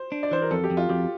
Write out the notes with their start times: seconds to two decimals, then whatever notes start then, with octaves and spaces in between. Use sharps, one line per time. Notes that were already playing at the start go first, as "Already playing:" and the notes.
Already playing: C5
0.12 D4
0.23 D5
0.31 E3 C5
0.42 A#4
0.51 F2 A4
0.64 G4
0.70 F2
0.77 F4
0.89 F2 G4